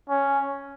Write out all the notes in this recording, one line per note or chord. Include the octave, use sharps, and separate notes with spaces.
C#4